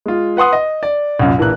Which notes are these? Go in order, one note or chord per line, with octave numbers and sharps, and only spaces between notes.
G#3 F4
B4 F#5 C6 D#6
D#5
D5
C2 F#2 A#2
A#1 E3 A#4 F#6